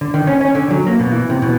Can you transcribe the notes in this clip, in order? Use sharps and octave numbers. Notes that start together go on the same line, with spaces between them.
D3
D#3
C#4
C#4
D3
F#3
A#3
B2
E3
C3
B2